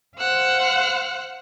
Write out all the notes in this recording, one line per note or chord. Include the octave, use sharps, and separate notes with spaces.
C5 F5 F#5 E6 F#6